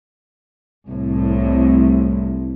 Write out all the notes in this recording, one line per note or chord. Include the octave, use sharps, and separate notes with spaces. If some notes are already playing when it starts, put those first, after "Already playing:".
C2 A2